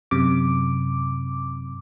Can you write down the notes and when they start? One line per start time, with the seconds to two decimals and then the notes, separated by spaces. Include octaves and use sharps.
0.11 F#2 C3 D6